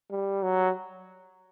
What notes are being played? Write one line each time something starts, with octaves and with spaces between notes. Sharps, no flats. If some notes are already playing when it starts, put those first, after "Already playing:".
G3
F#3